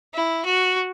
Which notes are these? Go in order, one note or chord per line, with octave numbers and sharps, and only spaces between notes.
E4
F#4